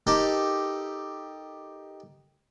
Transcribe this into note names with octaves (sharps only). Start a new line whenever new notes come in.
D#4 G4 A4 A#4